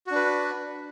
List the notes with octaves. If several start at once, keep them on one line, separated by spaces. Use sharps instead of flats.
D4 F#4 B4